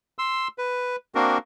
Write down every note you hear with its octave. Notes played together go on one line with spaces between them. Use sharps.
C6 E6
B4
A#3 C4 D4 F#4 A#4